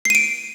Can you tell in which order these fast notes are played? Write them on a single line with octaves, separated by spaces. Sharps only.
C7 D#7 D7